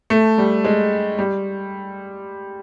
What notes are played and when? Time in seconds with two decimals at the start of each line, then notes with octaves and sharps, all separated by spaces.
0.10 A3
0.38 G3
0.64 G#3
1.19 G3